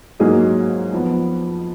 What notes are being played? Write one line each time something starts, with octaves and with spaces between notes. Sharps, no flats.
G#2 F#3 A#3 D#4 G#4
F2 F3 B3